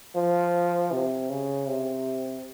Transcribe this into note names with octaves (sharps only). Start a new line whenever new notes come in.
F3
C3
C#3
C3